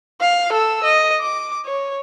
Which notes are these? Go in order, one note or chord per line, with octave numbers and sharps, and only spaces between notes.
F5
A4 E6
D#5
D6
C#5